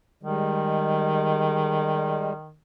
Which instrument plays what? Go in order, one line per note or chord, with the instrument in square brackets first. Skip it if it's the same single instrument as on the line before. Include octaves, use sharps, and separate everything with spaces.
[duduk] D#3 [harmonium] G3 G#3